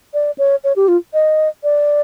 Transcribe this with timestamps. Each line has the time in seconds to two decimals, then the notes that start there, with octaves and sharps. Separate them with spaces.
0.14 D5
0.38 C#5
0.64 C#5
0.76 G4
0.88 F4
1.14 D#5
1.64 D5